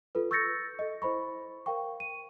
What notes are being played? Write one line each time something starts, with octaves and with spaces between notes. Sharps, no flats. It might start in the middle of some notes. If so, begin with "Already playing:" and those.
F4 A4 B4
C#6 E6 G6 A6 A#6 C#7
A4 D#5
E4 C5 B5 C#6
A#4 F5 G5 C#6
D#7